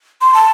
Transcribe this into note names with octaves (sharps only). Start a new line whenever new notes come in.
C6
A5